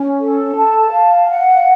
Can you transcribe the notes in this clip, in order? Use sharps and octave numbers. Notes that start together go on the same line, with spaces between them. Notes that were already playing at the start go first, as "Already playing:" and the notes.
Already playing: C#4
A4
A5
F5
F#5